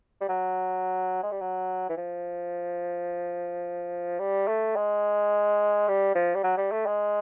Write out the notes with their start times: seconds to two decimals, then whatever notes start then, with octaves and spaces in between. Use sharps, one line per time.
0.21 G3
0.29 F#3
1.23 G#3
1.32 G3
1.41 F#3
1.90 E3
1.97 F3
4.20 G3
4.48 A3
4.76 G#3
5.88 G3
6.15 F3
6.35 G3
6.44 F#3
6.57 G3
6.72 A3
6.86 G#3